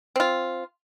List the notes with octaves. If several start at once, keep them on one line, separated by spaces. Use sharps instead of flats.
C4 F4